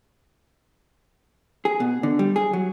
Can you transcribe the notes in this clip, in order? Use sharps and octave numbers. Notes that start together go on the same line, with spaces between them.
G#4
B2
D3
G3
G#4
F#3